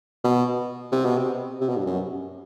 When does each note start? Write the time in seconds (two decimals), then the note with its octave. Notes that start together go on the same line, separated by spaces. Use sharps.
0.24 B2
0.92 C3
1.05 B2
1.18 C3
1.61 C3
1.69 B2
1.77 G2
1.86 F#2